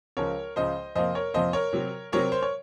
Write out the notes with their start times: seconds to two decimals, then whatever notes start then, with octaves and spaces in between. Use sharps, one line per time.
0.17 C#2 C#3 F3 A#4 C#5
0.56 C#2 C#3 F3 C5 D#5
0.95 F2 C3 F3 A#3 C5 D#5
1.15 A#4 C#5
1.34 F2 C3 F3 A#3 C5 D#5
1.53 A#4 C#5
1.73 C3 F#3 C4
2.12 C3 F#3 C4 A#4 C#5
2.32 C5
2.42 C#5